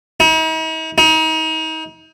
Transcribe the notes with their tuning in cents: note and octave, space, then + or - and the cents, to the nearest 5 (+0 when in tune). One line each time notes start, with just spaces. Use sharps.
D#4 +45
D#4 +35